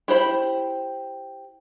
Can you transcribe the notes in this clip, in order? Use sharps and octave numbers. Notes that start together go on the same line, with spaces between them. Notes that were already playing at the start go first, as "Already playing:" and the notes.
E4 G4 C5 B5